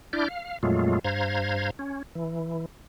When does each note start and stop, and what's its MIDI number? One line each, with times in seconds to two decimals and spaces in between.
0.13 0.28 62
0.13 0.28 64
0.13 0.28 74
0.13 0.28 89
0.13 0.28 91
0.28 0.58 77
0.63 0.99 41
0.63 0.99 46
0.63 0.99 54
0.63 0.99 56
0.63 0.99 57
0.63 0.99 65
1.05 1.70 43
1.05 1.70 72
1.05 1.70 77
1.05 1.70 82
1.05 1.70 92
1.79 2.02 61
2.15 2.66 52